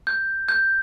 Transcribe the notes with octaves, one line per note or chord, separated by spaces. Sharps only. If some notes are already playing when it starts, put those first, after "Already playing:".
G6
G6